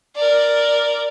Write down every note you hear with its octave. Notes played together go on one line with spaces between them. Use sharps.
A#4 D5